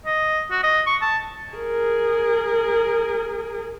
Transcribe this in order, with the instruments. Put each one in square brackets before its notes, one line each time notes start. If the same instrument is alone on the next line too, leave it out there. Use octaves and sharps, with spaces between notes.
[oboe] D#5
F#4
D#5
C#6
A5
[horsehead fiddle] G#4 A#4